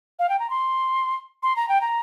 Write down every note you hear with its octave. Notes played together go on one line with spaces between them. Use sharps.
F5
G5
A#5
C6
C6
A#5
G5
A#5